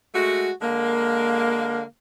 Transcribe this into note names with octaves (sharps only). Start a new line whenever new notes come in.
G#3 A3 F#4
D3 G#3 A#3